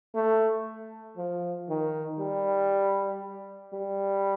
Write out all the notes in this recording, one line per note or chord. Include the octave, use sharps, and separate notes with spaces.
A3
F3
D#3
G3
G3